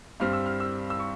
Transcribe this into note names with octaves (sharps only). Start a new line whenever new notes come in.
G2 G3 C4 F6
E6
F6
E6
E6
C#6